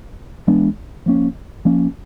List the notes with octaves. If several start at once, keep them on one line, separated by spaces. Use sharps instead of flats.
E3 G#3 B3 D4
F3 A#3 C#4
F3 A#3 C#4